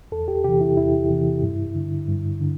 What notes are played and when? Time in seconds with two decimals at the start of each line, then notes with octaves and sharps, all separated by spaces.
0.12 E2 A4
0.28 G4
0.44 C3 E3 G4
0.61 E4
0.77 E2 E4
1.10 C3 E3
1.43 G2
1.75 D3
2.08 G2
2.41 D3